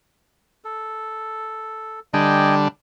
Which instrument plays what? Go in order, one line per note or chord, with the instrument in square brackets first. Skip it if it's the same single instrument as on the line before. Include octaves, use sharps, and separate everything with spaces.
[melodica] A4
[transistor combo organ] D3 G3 D4 [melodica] D#5 G5 G#5